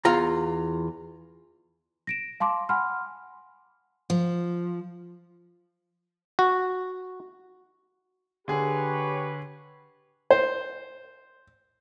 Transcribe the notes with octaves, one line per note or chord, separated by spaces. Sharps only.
E2 F4 F5 A#5
A#6 D7 E7
F5 A5 C6 D6
F#5 G#5 B5 C6 F6
F3
F#4
D3 G4 G#4 B4 C#5
C5